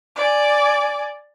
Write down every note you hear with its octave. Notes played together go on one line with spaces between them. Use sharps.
D5 G#5